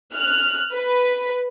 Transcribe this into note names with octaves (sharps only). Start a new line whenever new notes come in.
F6 F#6
B4